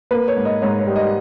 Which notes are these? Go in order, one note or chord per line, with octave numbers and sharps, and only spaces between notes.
A#3 B4
C#5
G#2
D#5
G#2 C#5
C#5
G3
D#5